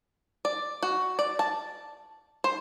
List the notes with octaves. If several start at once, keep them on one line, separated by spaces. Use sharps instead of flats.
D5
F#4
D5
A5
C5